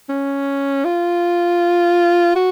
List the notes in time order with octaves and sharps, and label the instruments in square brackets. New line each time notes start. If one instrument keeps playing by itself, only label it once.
[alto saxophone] C#4
F4
F#4